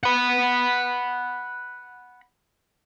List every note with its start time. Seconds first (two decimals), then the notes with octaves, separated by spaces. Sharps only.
0.03 F#5 B5